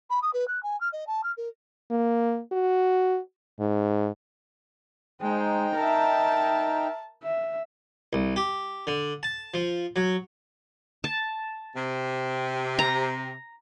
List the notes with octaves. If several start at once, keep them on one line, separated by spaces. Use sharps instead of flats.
B5
D#6
B4
F#6
G#5
F6
D#5
A5
F6
A#4
A#3
F#4
G#2
G#3 D#4 C5 G5
A#4 E5 A5
E5
C2
G4
D3
A5
F3
F#3
A5
C3
A#5